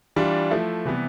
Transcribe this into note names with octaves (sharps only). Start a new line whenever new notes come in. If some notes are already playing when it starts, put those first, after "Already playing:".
E3 G3 D4 F4
F3 A3 E4
C3 E3 G3 B3